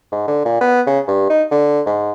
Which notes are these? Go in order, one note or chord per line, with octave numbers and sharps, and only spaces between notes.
G#2
D3
A#2
B3
C#3
G2
D#4
D3
G#2